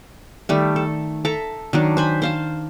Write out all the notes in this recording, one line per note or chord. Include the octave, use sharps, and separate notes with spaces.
D#3 G3 A3
A4
A4 E5 A5 A#5
D#3 F#3 D4
C5 G#5 B5
C5 F5 A5